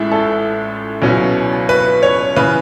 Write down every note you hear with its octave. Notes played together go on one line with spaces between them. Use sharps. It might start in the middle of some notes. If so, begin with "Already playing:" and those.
Already playing: A1 A2 G#3 E5
A4
C#2 B2 F#3 C#4 E4
B4
C#5
C#3 E3 B4